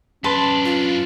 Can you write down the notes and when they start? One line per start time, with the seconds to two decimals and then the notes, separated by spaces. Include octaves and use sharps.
0.24 F#2 C#4 D4 B4 A5 C6
0.65 F4